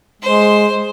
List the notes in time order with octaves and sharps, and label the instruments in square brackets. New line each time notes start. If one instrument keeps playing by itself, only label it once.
[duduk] G#3 [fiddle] C5